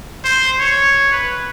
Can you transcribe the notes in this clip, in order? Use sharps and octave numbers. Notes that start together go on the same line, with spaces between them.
C5
C#5
B4